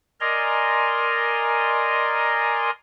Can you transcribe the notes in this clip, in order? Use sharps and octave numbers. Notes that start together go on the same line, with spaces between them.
A#4 D5 D#5 G#5 A#5 C6